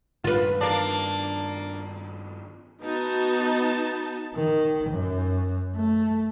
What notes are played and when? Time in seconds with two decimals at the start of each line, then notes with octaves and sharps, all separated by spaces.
0.24 G2 D#3 F4 B4
0.61 A#3 D4
2.83 B3 D#4 F#4 A5
4.35 D#3
4.90 F#2
5.76 A3